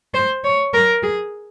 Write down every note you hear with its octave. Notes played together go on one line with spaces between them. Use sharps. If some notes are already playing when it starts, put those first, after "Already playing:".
C5
C#5
A#4
G#4